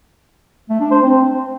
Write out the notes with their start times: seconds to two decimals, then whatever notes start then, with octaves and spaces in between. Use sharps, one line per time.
0.70 A3
0.80 D4
0.91 C5
1.02 C4